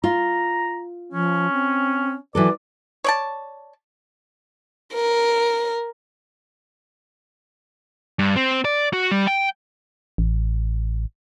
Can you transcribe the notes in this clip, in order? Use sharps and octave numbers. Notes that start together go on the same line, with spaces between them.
F4 A#5
F3 C#4
C4
E3 F#3 A4 B4 D5
C#5 D5 A5
A#4
G2
C4
D5
F#4
G3
G5
A1